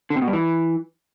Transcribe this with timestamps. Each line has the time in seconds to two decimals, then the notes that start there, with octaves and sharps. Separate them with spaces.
0.10 D3
0.16 C3
0.22 B2
0.28 G2
0.33 E3